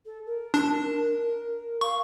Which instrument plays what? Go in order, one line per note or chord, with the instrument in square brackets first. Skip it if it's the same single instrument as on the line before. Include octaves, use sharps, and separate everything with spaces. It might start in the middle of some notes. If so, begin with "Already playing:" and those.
[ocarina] A4
A#4
[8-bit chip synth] D4
[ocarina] F5 [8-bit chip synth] C#6